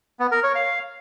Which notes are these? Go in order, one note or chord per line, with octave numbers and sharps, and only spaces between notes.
B3
A#4
C#5
F5